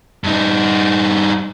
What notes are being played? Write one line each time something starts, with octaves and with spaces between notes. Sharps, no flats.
G2 D#4